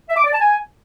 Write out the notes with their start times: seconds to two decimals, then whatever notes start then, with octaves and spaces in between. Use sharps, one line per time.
0.09 E5
0.17 D6
0.25 D5
0.32 A5
0.40 G#5